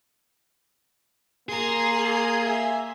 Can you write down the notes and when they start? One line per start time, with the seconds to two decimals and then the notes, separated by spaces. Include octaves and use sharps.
1.49 A#3 G#4 A#5 C6
2.45 E5 G#5